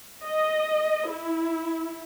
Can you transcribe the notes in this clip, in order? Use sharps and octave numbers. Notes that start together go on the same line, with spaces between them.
D#5
E4